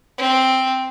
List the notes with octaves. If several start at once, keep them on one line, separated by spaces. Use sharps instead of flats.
C4